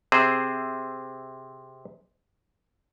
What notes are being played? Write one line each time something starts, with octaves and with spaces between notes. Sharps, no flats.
C3 C4 G#4 C5